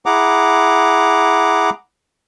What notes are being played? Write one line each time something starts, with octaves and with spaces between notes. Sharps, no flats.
E4 G#4 F#5 A#5 D6